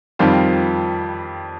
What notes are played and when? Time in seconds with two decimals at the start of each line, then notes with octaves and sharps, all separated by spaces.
0.19 F2 D#3 G3 C4 F4